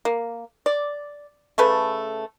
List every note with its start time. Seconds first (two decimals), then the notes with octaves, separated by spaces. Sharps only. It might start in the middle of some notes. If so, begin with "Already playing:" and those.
0.05 A#3
0.66 D5
1.58 C#3 A3 A4 B4